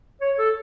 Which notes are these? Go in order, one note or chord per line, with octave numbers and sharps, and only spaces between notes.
C#5
A4